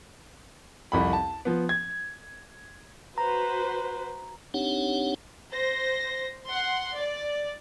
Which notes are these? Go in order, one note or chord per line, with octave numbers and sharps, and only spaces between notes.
C2 F2 B5
A5
F3 B3
G#6
F#4 B4 C5 A#5
C4 D4 D#4 G4 C#5 F#5
C5 A#6
F#5 C6
D5